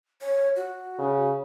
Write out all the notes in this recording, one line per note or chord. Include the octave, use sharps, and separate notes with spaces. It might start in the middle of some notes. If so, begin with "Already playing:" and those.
C#5
F#4
C#3